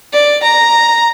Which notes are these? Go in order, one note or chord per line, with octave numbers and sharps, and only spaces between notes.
D5
A#5